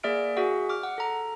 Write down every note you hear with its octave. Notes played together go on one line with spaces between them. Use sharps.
A#3 G#4 D5 E5 F6 D7
F#4 G#4 E5 F#5
D6 F6
F#5
A4 A#5